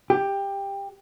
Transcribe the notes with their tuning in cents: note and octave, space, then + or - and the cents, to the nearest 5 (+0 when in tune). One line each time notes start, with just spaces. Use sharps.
G4 +15